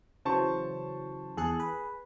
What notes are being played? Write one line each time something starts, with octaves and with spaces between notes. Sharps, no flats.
C#3 E3 F#3 C5 A5 C#6
E2 G#4 A4 F#6
B4